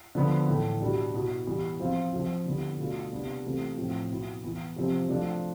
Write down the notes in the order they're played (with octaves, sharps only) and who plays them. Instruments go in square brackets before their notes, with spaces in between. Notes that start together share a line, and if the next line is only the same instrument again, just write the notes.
[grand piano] D3 F3 B3
A2 E3 A3
B2 G3 D4
B2 B3 E4
E3 G3 B3
F3 C4 F4
F3 C4 F4
D3 G3 B3 E4
B2 A3 D4 F4
C3 G3 B3 D4
C3 E3 A3 C4 F4
A2 F3 C4 F4
B2 B3 E4
E3 B3 E4
C3 F3 C4
F3 A3 D4 F4